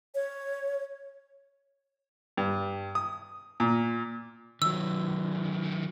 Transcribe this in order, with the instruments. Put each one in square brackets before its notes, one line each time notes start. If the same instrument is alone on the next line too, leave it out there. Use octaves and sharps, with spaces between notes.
[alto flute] C#5
[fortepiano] G2
D#6
A#2
[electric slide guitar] D#3 F#3 [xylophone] E6